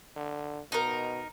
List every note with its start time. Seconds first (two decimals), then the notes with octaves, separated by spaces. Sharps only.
0.16 D3
0.72 B2 D#4 A#4